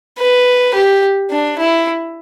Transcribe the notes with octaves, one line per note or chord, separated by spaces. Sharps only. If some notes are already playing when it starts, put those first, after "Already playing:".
B4
G4
D4
E4